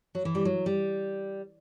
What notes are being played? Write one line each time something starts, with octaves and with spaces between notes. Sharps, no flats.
F#3
E3
G3
F#3
G3